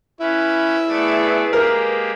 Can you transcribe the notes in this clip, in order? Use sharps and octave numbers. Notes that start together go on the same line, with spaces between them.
C#4 E4 B4
A3 B3 G#4 B4 D5
G#3 A#3 G4 A#4